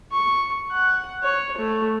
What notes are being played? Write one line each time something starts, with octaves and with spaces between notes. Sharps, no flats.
C#6
F#5
C#5
A3